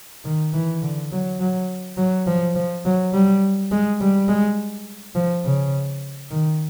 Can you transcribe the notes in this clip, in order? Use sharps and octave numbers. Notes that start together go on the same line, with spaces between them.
D#3
E3
D3
F#3
F#3
F#3
F3
F3
F#3
G3
G#3
G3
G#3
F3
C#3
D#3